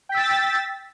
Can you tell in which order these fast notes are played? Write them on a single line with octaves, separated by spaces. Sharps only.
G5 B6 E6 A6